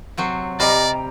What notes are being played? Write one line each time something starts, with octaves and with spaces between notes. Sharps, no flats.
C3 F#3 C4
C3 G3 G4 D5 D#5 A#5 F6 A#6